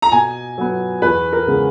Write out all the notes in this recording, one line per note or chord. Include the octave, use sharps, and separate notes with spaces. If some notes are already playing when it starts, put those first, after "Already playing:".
A#5
B2 G#5
F#3 B3
E2 B4
A#4
C#3 G#3 B3